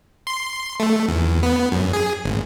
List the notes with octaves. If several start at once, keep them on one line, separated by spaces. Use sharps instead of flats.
C6
A3
E2
B3
F#2
G#4
G#1